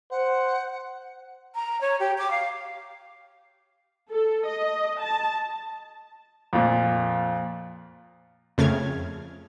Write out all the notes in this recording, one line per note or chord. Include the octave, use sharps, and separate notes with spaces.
C5 F#5
A#5
C#5
G4
D6
F5
A4
D#5
A5
F2 A#2
F2 C#3 A3 F6 G#6